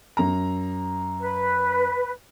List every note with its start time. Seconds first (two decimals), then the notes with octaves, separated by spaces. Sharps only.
0.17 F#2 A#5
1.21 B4